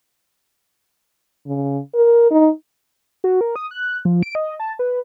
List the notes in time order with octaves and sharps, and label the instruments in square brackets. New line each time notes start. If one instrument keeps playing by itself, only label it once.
[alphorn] C#3
A#4
D#4
[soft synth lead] F#4
A#4
D#6
F#6
F3
D7
D#5
A5
B4